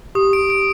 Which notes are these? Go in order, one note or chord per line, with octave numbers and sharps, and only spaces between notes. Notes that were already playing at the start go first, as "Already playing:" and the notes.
G4 D#6
D7
D7